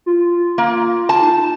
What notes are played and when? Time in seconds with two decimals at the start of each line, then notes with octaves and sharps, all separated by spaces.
0.06 F4
0.58 A#3
1.09 A5
1.21 D#4